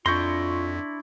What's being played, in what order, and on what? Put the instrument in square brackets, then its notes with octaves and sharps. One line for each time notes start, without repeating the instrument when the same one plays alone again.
[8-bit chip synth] F2 [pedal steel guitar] D4 E4 C6 [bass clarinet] F4 [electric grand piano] C#6 G6 A#6